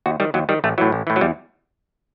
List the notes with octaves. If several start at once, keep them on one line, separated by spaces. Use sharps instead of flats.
D#2 F#4
D#3 G3
D#2 F#3
D#3 G3
A1 A3
A2 E3 F#3
A1
A2 E3
F#3
E2 G3